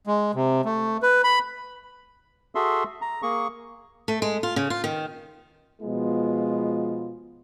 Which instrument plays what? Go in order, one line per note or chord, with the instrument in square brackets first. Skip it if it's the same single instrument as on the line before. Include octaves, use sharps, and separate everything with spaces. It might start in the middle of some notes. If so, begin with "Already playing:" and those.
[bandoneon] G#3
C3
A3
B4
B5
[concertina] F#4 G#4 A4 E5 C6
A#5
A#3 G#4 C#6
[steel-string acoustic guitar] A3
G#3
F4
C#3
F4
D#3
[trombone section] B2 F3 G#3 B3 F4